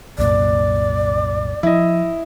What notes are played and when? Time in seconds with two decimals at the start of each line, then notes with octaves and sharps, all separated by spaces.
0.18 C2 F#2 A#2 D5
1.63 F3 E4 D#5